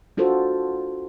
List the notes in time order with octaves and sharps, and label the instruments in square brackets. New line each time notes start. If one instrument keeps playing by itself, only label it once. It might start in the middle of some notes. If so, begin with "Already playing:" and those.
[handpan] D4 F4 F#4 A4 C5